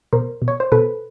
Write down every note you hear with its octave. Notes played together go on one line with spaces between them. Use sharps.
B2 A#4 C5
B2
C#5
C5
B2 A4 B4